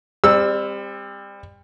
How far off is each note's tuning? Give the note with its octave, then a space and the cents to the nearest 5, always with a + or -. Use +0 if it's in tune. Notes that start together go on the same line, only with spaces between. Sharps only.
G3 +30 C4 +0 E6 +0